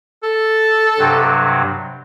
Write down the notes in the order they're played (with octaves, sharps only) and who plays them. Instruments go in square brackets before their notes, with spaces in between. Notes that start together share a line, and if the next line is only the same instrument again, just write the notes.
[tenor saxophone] A4
[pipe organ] G2 C3 F#3